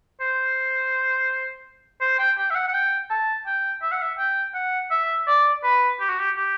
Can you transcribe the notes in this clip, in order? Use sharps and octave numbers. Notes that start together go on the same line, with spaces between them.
C5
C5
G5
G5
E5
F#5
F#5
G5
A5
G5
E5
F#5
E5
G5
F#5
E5
D5
B4
G4
F#4
G4
G4